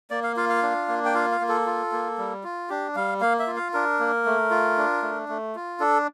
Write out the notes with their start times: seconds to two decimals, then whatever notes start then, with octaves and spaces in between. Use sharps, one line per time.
0.11 A#3 D5
0.23 F5
0.37 F4 F5
0.49 F5
0.63 D4
0.88 A#3
1.05 G5
1.14 F4 F5
1.31 F5
1.41 A#3
1.49 A4
1.66 F4
1.92 A#3
2.18 G3
2.44 F4
2.69 D4 G4
2.96 G3 F5
3.21 A#3 F5
3.39 E5
3.47 F4
3.56 F5
3.73 D4 A#4
3.99 A#3
4.26 A3
4.51 F4
4.77 D4
5.02 A3
5.29 A3
5.55 F4
5.80 D4 A4